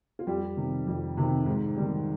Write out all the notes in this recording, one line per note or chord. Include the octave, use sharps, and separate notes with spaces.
F4
F2 G3 G4
C3 D#3
F2
C3 D#3
G#2
D#3 G3